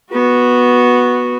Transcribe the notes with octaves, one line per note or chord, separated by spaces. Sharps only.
B3 F#4